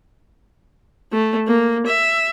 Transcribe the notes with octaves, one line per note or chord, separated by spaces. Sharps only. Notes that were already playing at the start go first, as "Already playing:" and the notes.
A3
A#3
E5